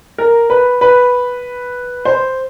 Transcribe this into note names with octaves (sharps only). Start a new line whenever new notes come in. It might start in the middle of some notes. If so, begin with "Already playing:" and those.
A#4
B4
B4
C5